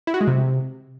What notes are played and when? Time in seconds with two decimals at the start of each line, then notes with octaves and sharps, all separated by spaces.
0.07 E4
0.14 F#4
0.21 G#3
0.27 C3